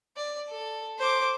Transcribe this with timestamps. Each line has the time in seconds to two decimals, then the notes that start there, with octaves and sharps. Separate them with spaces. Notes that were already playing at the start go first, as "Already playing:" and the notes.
0.17 D5
0.50 A4
0.98 C5 D6